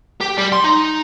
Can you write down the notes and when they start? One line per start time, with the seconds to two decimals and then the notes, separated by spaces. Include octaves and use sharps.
0.21 G4
0.38 G3
0.53 C6
0.64 D#4